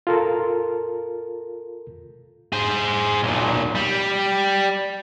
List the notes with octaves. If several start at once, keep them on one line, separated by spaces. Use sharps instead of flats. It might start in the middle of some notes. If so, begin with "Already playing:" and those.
F4 A4 A#4
G#4 C5
B1 A#2
G3